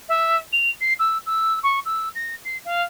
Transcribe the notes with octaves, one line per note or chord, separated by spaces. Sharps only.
E5
F7
C7
E6
E6
C#6
E6
A#6
C7
F5